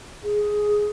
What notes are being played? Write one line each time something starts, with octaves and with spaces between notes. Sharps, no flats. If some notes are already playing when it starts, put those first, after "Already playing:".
G#4